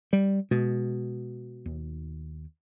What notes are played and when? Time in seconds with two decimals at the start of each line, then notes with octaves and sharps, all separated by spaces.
0.13 G3
0.51 B2 G#3
1.66 D#2